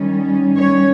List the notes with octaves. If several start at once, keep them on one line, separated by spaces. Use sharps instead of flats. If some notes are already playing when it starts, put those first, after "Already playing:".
Already playing: D#3 G3 C#4
C#5